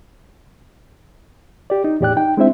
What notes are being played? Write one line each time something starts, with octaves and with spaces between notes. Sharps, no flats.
G4 D5
D#4
E2 A2 G4 D5 G5 F#6
D#4 G5
G#3 C4 D4 E4 C5 E5